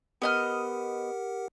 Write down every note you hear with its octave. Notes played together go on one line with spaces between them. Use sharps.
B3 G4 A#4 D#5 F#5 F6